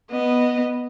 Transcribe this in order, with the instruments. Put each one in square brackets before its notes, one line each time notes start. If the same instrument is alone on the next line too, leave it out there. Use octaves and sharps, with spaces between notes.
[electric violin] B3 D#5